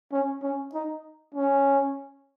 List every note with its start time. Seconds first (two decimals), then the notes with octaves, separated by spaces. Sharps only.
0.12 C#4
0.42 C#4
0.74 D#4
1.35 C#4